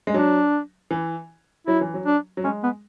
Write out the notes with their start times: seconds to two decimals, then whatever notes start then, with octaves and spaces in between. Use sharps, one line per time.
0.07 G#3
0.14 F#3 D4
0.91 E3
1.67 F#3 E4
1.81 E3
1.94 F#3
2.06 D4
2.37 F#3
2.44 G#3 C#4
2.63 B3